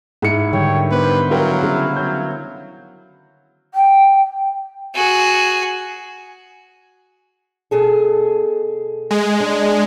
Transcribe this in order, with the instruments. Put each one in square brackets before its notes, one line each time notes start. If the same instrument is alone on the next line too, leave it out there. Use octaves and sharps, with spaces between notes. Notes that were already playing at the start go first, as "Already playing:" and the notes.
[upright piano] G#2 C#7 [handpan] E4
[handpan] D3 D#3 G3 [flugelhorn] C#5 [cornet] G5
[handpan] B3 C5 [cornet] G4 [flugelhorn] B4
[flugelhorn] F#3 [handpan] E4 [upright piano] A#4 G5 [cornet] F5
[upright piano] C#3 [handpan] E4
[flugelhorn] F#3 [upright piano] G6
[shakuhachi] G5
[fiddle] F#4 G#4
[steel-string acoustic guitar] B2 G#4 A4
[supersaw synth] G#3
[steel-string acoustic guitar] D4